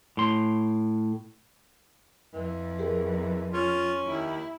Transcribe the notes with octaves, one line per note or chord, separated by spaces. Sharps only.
A2 C6
F2 E3
G4 G#4 A#4
C#4 F4
D#2 E4